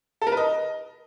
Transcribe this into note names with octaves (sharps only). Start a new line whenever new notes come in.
A4
A#4
B4
D#5